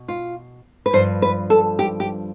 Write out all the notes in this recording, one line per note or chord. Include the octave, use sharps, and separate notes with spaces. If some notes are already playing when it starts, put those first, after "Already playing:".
Already playing: B2
F4
B4
G2 F3 C5
B4
A4
G4
G4